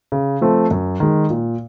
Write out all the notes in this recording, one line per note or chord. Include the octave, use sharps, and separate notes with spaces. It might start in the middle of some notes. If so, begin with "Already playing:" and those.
C#3
F3 A3 C4
F#2
D#3 G#3
A#2